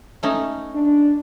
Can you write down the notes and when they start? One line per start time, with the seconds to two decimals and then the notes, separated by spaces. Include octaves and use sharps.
0.23 A3 C#4 D#4
0.73 D4